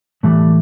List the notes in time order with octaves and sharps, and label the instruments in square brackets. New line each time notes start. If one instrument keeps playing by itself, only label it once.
[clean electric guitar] A2 E3 G3 A3